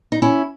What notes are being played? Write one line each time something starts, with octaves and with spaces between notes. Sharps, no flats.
D#4
C#4 E4